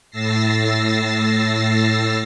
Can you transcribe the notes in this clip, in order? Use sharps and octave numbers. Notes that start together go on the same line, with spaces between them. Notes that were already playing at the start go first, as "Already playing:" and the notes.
A2 E6 A6 A#6 C7